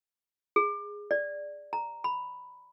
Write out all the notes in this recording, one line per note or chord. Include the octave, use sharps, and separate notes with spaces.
G#4
D5
A#5
B5